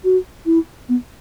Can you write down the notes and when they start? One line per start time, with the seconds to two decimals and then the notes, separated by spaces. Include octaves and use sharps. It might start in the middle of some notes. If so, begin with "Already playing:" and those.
0.04 F#4
0.46 E4
0.89 B3